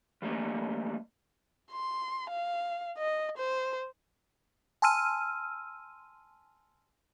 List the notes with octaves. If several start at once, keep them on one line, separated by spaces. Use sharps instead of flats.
E3 G3 A3 A#3
C6
F5
D#5
C5
G#5 A5 C6 E6 F6 D#7